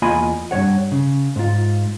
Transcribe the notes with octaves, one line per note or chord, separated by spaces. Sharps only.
E2 A#3 F4 D#5 G#5 B5
G2 C#3 C#5 F#5
C#3
G#2 F4